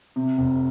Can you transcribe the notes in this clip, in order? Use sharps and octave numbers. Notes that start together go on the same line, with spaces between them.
C3
F1